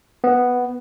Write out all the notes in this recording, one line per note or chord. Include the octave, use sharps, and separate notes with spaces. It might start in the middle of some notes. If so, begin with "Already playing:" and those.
B3